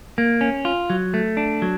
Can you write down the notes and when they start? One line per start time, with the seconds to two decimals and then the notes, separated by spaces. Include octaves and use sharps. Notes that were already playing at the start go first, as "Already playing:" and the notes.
0.18 A#3
0.41 C#4
0.65 F4
0.90 F#3
1.14 A3
1.37 D4
1.62 F#3